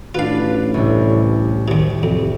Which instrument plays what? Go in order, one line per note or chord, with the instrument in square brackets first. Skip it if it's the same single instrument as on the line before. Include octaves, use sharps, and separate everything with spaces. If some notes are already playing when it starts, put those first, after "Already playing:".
[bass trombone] A1 [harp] D4 B4 [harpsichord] F4 F5
[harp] C2 A2
[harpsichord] D#2 C3
[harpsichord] F2 [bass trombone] C3